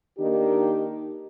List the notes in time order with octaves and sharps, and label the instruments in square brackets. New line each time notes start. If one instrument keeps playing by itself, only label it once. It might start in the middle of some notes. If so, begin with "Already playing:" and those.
[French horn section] D#3 A#3 D4 D#4 G4